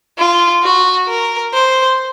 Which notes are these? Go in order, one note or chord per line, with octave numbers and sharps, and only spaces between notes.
F4
F#4
A#4
C5